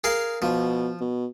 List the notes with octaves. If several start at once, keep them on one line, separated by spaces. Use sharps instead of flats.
G#4 A#4 F5
B2 F3
B2